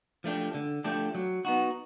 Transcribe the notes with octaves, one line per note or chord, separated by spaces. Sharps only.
F3 A3 D4 G4
D3
F3 A3 D4 G4
F#3
B3 D#4 F#4